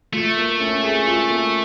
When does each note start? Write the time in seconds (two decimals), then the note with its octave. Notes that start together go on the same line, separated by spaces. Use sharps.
0.13 A3 F4
0.37 A#3
0.60 C#4
0.83 G#4
1.07 F4
1.30 A#3